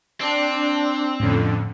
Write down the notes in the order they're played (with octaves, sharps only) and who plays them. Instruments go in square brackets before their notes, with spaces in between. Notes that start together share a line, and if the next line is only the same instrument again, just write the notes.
[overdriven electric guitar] C4 [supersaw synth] D4
[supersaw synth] F2 D3 [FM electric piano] A2 C#4